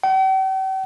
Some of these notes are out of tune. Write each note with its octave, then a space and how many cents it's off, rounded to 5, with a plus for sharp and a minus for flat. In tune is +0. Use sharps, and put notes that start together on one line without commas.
G5 -45